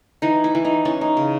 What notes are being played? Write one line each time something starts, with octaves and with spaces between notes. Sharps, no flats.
E3 D#4
E4
E3
D#4
E3 C#4
D#4
C#3